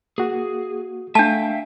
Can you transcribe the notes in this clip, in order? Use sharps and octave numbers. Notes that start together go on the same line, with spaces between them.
A#3 F#4 G#4
A3 D4 E5 F5 G5 A5